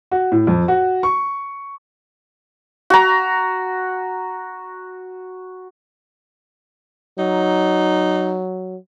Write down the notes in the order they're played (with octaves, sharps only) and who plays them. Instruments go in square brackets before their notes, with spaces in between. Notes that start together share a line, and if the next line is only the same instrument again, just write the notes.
[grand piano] F#4
A2
F2
F#4
C#6
[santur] F#4 A#5
[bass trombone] F#3 [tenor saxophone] D#4